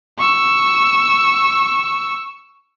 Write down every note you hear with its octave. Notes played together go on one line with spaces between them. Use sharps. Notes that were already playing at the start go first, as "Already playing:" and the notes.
C#6 E6